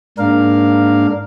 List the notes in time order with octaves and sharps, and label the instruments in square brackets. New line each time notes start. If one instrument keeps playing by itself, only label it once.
[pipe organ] G#2 A#3 D4 A#4 F5